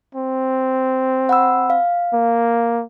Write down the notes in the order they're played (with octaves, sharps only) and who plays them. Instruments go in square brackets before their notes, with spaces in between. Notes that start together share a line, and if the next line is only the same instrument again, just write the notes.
[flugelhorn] C4
[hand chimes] F#5 B5 E6
F5
[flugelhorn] A#3